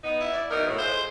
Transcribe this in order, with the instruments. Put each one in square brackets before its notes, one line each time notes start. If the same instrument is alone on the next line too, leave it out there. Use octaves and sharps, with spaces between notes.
[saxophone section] B3 D#4
[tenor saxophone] E4
[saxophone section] D5
[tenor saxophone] B2 [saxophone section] E3 D#4 A#4
[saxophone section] A2
[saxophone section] G#3 F4 [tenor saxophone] C5